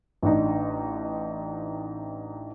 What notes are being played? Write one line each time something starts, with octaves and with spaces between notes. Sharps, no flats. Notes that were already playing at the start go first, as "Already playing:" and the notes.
A1 D4 D#4